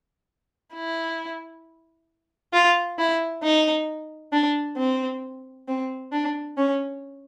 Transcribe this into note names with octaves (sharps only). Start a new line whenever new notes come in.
E4
F4
E4
D#4
D4
C4
C4
D4
C#4